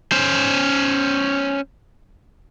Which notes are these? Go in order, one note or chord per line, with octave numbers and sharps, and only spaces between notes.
C#4 C5